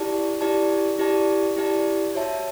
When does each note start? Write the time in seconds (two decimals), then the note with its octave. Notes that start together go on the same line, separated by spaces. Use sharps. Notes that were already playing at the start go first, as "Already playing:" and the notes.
Already playing: E4 G4 D5 A5
0.41 E4 G4 D5 A5
0.98 E4 G4 D5 A5
1.56 E4 G4 D5 A5
2.14 F#4 C#5 E5 A5